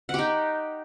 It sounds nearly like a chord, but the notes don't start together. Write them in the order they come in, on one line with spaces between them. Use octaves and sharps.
F#5 G4 D#4